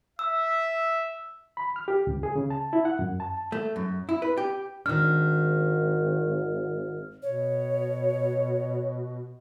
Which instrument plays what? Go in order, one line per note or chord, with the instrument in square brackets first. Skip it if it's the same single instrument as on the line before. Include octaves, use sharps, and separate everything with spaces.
[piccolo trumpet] E5 [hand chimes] E6
[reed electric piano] B5
F6
G4
C#2
G#4
C#3
A5
E4
F#5
F#2
A5
[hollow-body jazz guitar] A3
F#2
E4
B4
G4
[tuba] G#1 [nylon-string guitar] D#3 D4 [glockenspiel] F6
[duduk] B2 [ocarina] C#5